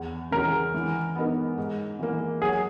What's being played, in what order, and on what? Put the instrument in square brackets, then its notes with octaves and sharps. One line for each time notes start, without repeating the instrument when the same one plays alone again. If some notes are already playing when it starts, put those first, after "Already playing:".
Already playing: [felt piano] E2
[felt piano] C#3 E3 G#3 [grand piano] A#4
[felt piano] E3
B3 D#4 A#4
G#2
E3 A#3
[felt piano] F#3 [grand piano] G#4